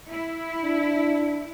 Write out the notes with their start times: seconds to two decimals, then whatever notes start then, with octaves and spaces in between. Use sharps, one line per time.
0.10 E4
0.62 D4